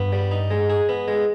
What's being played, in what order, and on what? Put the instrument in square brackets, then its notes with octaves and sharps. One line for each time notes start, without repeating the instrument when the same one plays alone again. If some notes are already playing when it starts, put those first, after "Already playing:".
Already playing: [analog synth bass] G2 [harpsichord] B3
[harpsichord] G3
D#4
G#3
G#4
B3
G#3